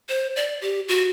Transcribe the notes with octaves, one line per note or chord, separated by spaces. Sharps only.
C5
D5
G4
F#4